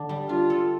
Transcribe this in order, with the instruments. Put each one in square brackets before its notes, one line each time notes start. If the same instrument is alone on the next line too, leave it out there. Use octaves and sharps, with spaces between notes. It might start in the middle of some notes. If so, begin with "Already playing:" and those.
Already playing: [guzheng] D3 D4
G3
[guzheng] D4 [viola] F4
[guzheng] A4